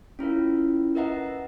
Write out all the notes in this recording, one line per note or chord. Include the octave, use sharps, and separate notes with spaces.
C#4 E4 F4 A#4
A#4 B4 D#5 E5 F#5 A#5